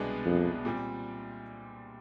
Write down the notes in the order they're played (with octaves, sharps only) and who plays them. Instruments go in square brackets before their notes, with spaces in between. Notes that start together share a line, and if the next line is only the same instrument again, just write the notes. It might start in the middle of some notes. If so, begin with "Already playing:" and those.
Already playing: [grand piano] C2 B2 G#3 B3 D4
[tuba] F2
[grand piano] A#2 G3 C4